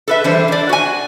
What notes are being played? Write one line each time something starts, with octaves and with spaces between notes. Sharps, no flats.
A4 B4 E5
E3 G3 D4 C5
D4 D5
F#4 G#5